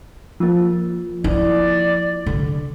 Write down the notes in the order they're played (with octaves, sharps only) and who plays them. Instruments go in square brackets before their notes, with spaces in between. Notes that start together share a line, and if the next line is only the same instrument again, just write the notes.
[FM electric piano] F3 A#3
[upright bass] E4 [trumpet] D5
[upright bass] D3